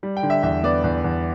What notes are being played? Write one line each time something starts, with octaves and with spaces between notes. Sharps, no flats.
G3
G5
D3
E5
E2 E5
B3 D5
E2
E2